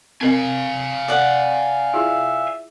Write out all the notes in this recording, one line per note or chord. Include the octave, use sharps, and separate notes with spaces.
C4 A#4 D#5 F5 G#5
D5 F#5
E4 F4 G#4 E5